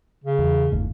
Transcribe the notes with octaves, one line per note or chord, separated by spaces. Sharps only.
C#3
E2
G1 D#2 A2